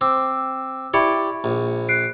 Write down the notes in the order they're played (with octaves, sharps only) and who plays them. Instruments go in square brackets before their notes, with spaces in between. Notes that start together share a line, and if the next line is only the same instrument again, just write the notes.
[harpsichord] C4 [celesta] D6 E6
[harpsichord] E4 G4 D5 [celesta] B5 C#6 C#7
[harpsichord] A#1
[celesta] F#6 C7 D7